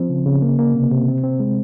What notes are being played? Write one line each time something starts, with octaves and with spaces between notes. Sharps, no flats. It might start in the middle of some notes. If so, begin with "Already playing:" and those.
Already playing: F3 C4
C#3
C#3
A#3
A#3
C3
C3
C4
C4
G#3